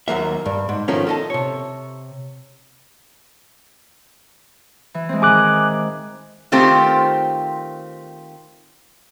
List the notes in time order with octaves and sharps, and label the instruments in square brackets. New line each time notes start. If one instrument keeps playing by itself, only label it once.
[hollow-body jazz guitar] D#2 F#3 A#3 E5
G2
G#2
D#3 F3 A3 A#3 C#4
A4 D#5 A5
C3 C#5
[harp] E3
G#3 C4
[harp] D#3 G#4 [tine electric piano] G#5 D6 F#6
[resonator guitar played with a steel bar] D#3 A3 C4 F4 G4 C5